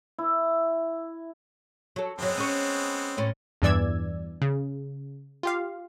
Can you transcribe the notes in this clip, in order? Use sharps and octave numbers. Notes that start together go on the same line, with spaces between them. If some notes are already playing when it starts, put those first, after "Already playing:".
E4
F#3 A4
F#2 F#3 G#3 B3 C4
C#4 C#5
A2 C4 C#4
E2 G2 E3 D5 E6 G#6
C#3
F4 G4 F5